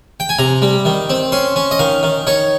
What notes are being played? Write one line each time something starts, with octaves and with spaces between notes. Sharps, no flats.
G5
G#5
C3 A#5
G3
D#3
C4
C#4 C6
C#4
D#5
D#3 F5
D#3
D#4 C#5